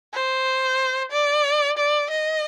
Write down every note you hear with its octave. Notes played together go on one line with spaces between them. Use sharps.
C5
D5
D5
D#5